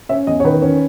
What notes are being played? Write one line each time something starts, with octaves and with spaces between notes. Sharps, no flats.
C#4 E5
E2 D#5
C#5
D#3 B4
C#4